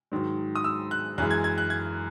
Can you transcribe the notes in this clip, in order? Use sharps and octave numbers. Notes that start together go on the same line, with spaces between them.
G#2 D#3 F#3
D#6
E6
F#6
F#2 E3 G#3 F#6
G#6
G#6
F#6
G#6